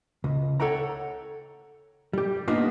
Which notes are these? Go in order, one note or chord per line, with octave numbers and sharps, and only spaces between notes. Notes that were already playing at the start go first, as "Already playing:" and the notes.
C#2
A4 C#5 F#5 G5 A#5
G3 G4
G#3 A#3 B3 D4 D#4 F4